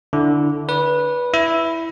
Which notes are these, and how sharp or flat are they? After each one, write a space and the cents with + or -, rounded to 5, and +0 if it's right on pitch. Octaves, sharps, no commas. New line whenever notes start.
D3 +0 E4 -10
B4 -15 D5 -40
E4 +0 E5 +0